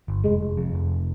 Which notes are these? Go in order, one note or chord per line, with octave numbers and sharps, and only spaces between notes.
G1
F1 G#3
F1
F2
F1